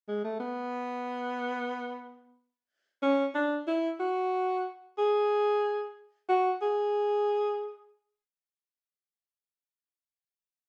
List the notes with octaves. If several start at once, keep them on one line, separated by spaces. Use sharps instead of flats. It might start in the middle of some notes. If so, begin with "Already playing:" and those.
G#3
A3
B3
C#4
D4
E4
F#4
G#4
F#4
G#4